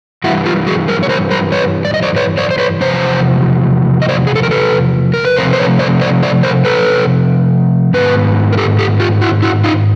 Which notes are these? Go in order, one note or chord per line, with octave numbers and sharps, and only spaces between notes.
G2 E3 G3 E4 F#4
F4 G4
F#4 G#4
G#4 A#4
C#5
A#4 C5
A#4 C5
B4 C#5
D5
D#5
C5 D5
B4 C#5
C5 D5
C5
B4 C#5
E2 C3 F3 C5
D#5
C5 D5
G#4
A4
A#4
A4 B4
A#4
B4
C3 F3 A3 C4 A#4 C5
C5
B4 C#5
C5 D5
C5 D5
C5 D5
A#4 C5
A4 B4
G#2 D#3 B3 B4
A#4
G4 A4
G4 A4
F4 G4
E4 F#4
E4 F#4
D#4 F4